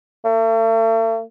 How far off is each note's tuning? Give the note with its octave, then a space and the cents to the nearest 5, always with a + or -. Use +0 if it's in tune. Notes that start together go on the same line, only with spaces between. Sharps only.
A3 +40